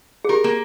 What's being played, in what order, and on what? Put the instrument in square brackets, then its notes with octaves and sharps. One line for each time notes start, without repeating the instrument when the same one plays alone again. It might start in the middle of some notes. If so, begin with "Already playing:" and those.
[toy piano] G#4
[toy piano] G4 [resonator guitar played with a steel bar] A#4
[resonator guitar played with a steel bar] A#3